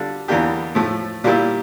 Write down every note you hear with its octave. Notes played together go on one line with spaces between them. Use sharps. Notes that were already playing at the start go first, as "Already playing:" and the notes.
Already playing: D3 G3 D4 F4
E2 E3 A#3 D4 G4
A2 F3 A3
A#2 G3 A#3 E4 G4